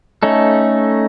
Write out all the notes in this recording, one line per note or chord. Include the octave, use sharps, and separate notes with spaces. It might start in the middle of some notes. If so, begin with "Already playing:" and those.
A3 C#4 D#4 A4